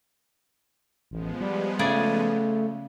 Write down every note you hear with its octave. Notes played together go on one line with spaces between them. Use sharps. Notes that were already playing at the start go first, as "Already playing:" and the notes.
A1 F3 G#3 B3
G3
C#3 A3 G#4 D5